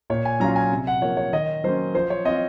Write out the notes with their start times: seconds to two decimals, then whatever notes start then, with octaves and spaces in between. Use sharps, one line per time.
0.10 A#2 C#5
0.25 G#5
0.40 F#3 C#4 F4 A#5
0.56 G#5
0.72 C3
0.87 F#5
1.02 F3 A#3 C#5
1.17 C#5
1.33 D#3 D#5
1.64 F#3 A#3 C#4 C5
1.95 F3 C5
2.10 C#5
2.25 C4 F4 D#5